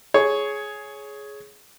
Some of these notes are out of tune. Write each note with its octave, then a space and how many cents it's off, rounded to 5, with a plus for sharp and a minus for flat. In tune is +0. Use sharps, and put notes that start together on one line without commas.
G#4 +10 C#5 +0